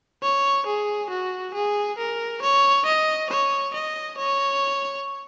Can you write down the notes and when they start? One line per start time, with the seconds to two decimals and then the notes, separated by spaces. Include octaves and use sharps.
0.23 C#5
0.66 G#4
1.10 F#4
1.54 G#4
1.98 A#4
2.42 C#5
2.86 D#5
3.30 C#5
3.74 D#5
4.18 C#5